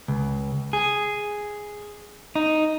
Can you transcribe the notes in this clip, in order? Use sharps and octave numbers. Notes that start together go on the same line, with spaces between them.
C#2
G#4
D#4